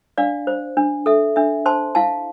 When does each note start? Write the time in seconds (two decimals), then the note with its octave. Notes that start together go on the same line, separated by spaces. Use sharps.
0.18 D4 D5 F5
0.47 C5
0.77 D4
1.06 A4 E5
1.36 D4 E5
1.66 C5 A5 C6
1.95 E4 F5 A5